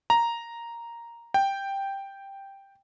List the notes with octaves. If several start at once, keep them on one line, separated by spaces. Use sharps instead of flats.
A#5
G5